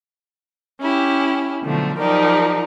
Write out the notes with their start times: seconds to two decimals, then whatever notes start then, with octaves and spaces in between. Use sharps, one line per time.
0.81 C#4 E4 G4
1.64 B2 D3 F3 F#3 A3
1.99 F3 F#3 D#4 G4 A#4 D5